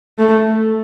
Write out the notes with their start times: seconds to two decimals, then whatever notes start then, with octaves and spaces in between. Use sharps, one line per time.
0.19 A3